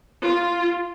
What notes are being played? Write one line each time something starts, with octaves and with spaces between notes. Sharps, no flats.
F4